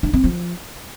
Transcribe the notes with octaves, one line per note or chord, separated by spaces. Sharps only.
D4
C4
F3